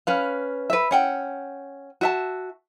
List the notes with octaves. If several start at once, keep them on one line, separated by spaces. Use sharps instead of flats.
C#4 B4 F5
B4 E5
C#4 F#5 G5
F#4 E5 A5